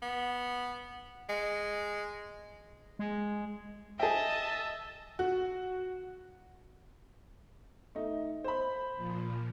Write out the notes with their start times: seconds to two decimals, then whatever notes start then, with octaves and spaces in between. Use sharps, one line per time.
0.02 B3
1.29 G#3
2.99 G#3
3.99 G#4 D#5 E5 G5 A5
5.19 F#4
7.95 A3 D#4
8.44 C5 B5
8.95 A#2 F3